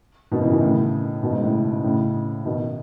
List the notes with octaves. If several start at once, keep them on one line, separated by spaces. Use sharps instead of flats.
B2 D#3
C#3 E3
B2 D#3
A2 C#3
B2 D#3
G#2
A2 C#3
A2 C#3
B2 D#3